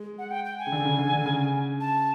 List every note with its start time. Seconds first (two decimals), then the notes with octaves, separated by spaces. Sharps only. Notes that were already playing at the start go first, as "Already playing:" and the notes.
Already playing: G#3
0.18 F#5
0.31 G5
0.45 G5
0.58 G#5
0.67 C#3
0.72 D3
0.85 C#3
0.99 D3
1.12 D3
1.26 C#3
1.80 A5